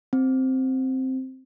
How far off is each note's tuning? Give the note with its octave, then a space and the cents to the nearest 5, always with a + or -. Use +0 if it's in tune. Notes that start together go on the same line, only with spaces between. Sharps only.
C4 +0